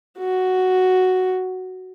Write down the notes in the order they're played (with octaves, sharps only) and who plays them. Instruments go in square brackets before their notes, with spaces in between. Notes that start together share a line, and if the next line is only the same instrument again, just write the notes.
[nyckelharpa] F#4